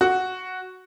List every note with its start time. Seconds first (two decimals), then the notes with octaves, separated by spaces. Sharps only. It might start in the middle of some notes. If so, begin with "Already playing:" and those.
0.01 F#4